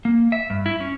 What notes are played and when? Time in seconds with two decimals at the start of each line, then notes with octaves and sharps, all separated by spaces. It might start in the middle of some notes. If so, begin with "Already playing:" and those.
0.05 A#3
0.32 E5
0.50 G2
0.66 E4
0.80 C#4